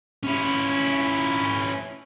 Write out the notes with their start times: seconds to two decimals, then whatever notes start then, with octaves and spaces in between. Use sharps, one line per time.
0.23 C#4 E4